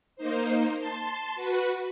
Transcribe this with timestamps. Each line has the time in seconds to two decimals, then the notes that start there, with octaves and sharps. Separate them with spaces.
0.16 A#3 D#4 C5
0.78 A5 C6
1.35 F#4 B4